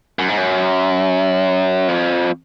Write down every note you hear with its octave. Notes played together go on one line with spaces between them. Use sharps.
F#2
G#2
F#2
F2